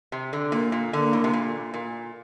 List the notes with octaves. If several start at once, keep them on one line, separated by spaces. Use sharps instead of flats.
C3
D3
A#2 A#3
A#2
D3 A#3
A2
C3
A#2
A#2